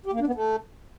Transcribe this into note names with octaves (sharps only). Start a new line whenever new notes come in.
G4
A#3
D4
B3
A3